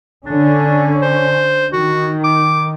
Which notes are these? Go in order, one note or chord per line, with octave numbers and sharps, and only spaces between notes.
D3 C#4 D4
C5
D#3 F#4
D6